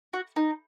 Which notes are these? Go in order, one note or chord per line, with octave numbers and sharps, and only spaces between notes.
F#4
D#4